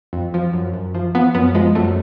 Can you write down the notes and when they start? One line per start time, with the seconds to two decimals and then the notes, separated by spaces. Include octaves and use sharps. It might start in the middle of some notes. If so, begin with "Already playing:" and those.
0.13 F2
0.34 F3
0.53 F#2
0.74 F#2
0.94 F3
1.15 F3 B3
1.35 F#2 B3
1.55 F3 G#3
1.75 F#2 A3